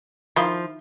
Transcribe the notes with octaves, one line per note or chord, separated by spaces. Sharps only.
D#3 F3 E4 F4